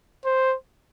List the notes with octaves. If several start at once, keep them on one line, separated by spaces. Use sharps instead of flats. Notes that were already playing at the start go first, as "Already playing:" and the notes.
C5